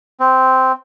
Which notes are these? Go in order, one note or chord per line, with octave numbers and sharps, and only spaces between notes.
C4